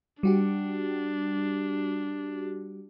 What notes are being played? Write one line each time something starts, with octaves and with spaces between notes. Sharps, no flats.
G3 D4 F#4 G4